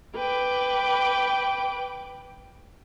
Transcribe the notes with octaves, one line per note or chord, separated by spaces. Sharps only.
B4 G5 D6